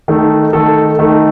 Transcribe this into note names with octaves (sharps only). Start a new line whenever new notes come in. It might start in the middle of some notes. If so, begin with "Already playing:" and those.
D#3 A3 D#4 A4
D#3 A3 D#4 A4
D#3 A3 D#4 A4